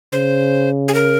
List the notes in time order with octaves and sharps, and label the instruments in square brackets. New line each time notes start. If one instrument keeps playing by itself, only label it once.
[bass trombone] C#3 [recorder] C5
[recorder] G#4
A#4